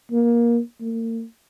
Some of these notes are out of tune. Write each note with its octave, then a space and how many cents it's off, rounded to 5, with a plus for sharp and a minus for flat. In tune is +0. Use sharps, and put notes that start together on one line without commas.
A#3 +20
A#3 -40